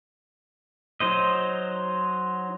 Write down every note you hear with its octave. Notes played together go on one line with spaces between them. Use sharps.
F#3 D#4 C5 D#5